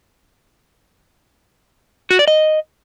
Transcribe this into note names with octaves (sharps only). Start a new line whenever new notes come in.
F#4
D5
D#5